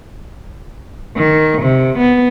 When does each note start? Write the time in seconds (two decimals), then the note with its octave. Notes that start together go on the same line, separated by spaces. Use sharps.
1.16 D#3
1.62 C3
1.98 B3